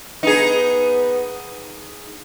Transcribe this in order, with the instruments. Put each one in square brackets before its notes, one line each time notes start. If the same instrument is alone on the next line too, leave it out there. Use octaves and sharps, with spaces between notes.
[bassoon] B3 [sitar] D#4 G#4